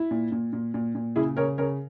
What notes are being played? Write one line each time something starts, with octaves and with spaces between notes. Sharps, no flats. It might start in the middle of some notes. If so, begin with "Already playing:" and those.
Already playing: E4
A#2
A#2
A#2
A#2
A#2
C#3 E4 G#4
C#3 A#4 C#5
C#3 A#4 C#5